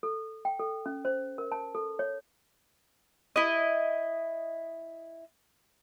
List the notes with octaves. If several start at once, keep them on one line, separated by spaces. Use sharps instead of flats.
A4
G5
A4
C#4
C5
A#4
A5
A4
C#5
E4 D#5